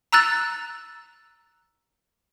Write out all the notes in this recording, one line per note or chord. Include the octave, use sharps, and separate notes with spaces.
A#5 E6 F#6 A6